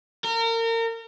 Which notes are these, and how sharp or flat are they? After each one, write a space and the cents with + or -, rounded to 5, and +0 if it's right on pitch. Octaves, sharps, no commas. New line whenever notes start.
A#4 -30